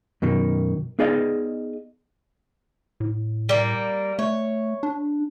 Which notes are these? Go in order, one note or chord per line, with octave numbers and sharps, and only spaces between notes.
F#2 B2 D#3
B3 D#4 G#4 D5 D#5 F5
A2
G3 A#3
A3 C#5
D4